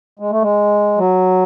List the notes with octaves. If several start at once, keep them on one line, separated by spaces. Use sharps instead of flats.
G#3
A3
G#3
F#3